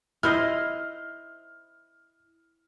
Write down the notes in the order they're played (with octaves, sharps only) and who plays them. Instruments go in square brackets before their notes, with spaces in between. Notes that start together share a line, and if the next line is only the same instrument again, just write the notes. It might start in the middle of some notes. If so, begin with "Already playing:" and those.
[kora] E4 C5 D#5 [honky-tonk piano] F6